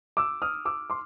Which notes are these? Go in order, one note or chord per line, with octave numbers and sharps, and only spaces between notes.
D6 E6
D#6 F6
D6 E6
C6 D6